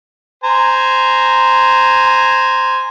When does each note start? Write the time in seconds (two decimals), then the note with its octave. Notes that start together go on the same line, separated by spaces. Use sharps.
0.44 C5 G#5 A#5